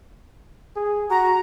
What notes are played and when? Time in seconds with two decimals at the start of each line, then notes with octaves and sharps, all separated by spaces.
0.76 G#4
1.10 F#4 A#5